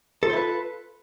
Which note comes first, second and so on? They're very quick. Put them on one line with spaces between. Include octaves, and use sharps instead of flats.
A4 F4 C5 E4 B4